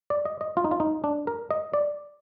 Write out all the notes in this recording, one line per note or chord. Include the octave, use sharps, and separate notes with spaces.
D5
D#5
D#5
F4
D#4
F4
D#4
D4
A#4
D#5
D5